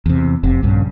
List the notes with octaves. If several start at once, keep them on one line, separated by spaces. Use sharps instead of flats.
E2 C3
F1 C3
A#1 G2 C#3